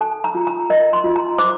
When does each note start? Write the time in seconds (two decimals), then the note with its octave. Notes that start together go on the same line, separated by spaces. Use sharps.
0.01 A4 A5
0.24 A#5
0.35 F4
0.47 A#5
0.70 A#4 D#5
0.93 C6
1.04 F4
1.16 A#5
1.38 C5 D6